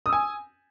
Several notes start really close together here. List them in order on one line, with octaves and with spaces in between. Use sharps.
D#6 E6 G#5